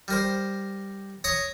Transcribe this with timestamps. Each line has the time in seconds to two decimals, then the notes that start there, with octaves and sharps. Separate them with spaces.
0.08 G3 A#4 C5
1.24 C#5 A#5 C#6 D#6